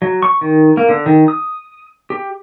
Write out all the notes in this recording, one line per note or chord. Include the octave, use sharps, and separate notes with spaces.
F#3
C#6
D#3
A#3
D3
D#3
D#6
G4